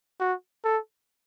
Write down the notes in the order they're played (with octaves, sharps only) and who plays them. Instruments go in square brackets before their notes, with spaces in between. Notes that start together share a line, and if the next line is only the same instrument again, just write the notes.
[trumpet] F#4
A4